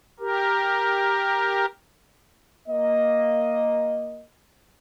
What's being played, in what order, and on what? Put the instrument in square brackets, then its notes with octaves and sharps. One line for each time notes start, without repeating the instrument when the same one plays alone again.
[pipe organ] G4 A#4
[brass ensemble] A#3 D#5